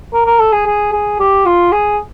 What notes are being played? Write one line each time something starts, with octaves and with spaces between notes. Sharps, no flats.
A#4
A#4
A4
G#4
G#4
G#4
G4
F4
G#4